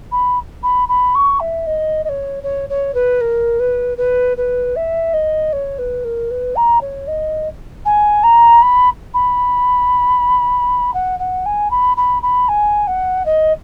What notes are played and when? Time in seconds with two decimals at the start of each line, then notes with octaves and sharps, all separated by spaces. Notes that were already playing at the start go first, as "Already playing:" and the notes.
0.12 B5
0.63 B5
0.88 B5
1.15 C#6
1.40 E5
1.66 D#5
2.04 D#5
2.09 C#5
2.43 C#5
2.69 C#5
2.94 B4
3.20 A#4
3.59 B4
3.97 B4
4.37 B4
4.76 E5
5.13 D#5
5.52 C#5
5.78 B4
6.04 A#4
6.30 B4
6.55 A#5
6.81 C#5
7.07 D#5
7.85 G#5
8.23 A#5
8.62 B5
9.14 B5
10.93 F#5
11.19 F#5
11.45 G#5
11.70 B5
11.97 B5
12.22 B5
12.48 G#5
12.87 F#5
13.25 D#5